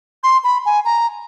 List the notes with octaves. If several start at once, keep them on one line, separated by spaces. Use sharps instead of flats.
C6
B5
G#5
A#5